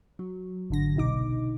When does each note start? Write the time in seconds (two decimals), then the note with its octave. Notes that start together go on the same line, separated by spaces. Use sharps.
0.19 F#3
0.70 G#1 D3 A#6
0.96 C2 B2 D#4 D6